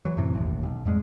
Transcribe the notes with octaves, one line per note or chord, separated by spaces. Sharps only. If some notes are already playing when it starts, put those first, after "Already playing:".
E3 F#3
F#2 A2 C3 E3
E1 A1 D#2
B1
F2 G#2 G3 G#3